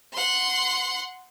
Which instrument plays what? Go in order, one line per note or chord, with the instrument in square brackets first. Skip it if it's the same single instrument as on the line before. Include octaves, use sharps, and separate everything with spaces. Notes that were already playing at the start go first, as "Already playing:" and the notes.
[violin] F#5 C6